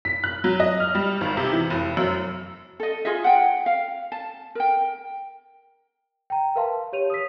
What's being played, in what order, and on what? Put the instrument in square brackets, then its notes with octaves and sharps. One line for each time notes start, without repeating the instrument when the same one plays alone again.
[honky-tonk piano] B6
F#6
F#3
D#5
F6
G3
G#1
C3
E3
F1
F#2
[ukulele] A4 D#5
F4 G#4 D#5 E5
F#5 G5
F5
A5
A#4 G5
[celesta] G5 A#5
A#4 B4 E5 F5 A5 C6
G4 C#5 D#7 F7
D#6 E6 B6